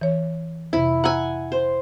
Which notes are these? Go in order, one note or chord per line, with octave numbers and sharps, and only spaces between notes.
E3 C#5
F2 C3 E4
F#5 G#5 A#5 E6
C5